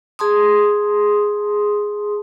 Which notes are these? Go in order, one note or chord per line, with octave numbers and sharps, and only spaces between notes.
G#4 A5 C6 D#6